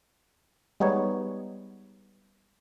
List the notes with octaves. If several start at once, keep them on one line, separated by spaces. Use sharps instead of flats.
G3 G#3 B3 D#4 C#5